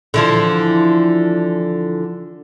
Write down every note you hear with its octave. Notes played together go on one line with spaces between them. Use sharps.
D3 E3 F3